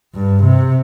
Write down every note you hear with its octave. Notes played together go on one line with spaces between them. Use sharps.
G2
C3